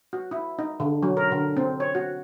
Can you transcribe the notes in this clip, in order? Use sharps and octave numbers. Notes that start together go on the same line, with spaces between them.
F#4
E4
D#4
D3
F#3
A#4
D3
C4
C#5
F#4